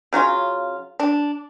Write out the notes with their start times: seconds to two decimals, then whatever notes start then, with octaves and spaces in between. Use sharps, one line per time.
0.13 C#3 F#3 C#4 F4
1.00 D4